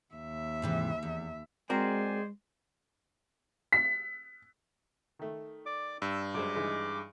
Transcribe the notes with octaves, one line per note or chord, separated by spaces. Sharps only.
D#2 E5
G#2 C3 E3
E2
G#3 C4 F#4 A#4 C5 D5 G#5
B6
D#3 A3
D5 D6
G2 E6
F#2 G#3 C5 D6
E3 G#3 D#4